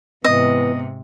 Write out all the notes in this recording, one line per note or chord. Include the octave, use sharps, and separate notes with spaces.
G#2 C3 E3 B3 D#5